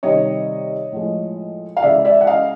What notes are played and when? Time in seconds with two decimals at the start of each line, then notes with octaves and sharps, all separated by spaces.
0.03 C3 D#3 G3 C#5 D#5
0.92 A2 F3 G#3
1.77 F5
1.82 C#3 E3 G#3 D5 E5
2.05 D5 E5
2.21 F#5
2.27 D#5 F5